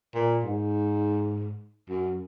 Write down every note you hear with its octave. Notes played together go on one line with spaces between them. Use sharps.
A#2
G#2
F#2